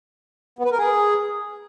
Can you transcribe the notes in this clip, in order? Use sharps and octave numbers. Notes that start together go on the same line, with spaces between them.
B3
B4
A#4
G#4